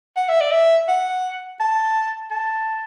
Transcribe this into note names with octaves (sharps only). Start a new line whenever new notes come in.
F#5
E5
D5
E5
F#5
A5
A5